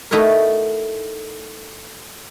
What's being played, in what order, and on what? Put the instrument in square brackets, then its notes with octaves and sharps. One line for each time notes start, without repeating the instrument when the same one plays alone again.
[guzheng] A3 D#4 E4 F#4 A#4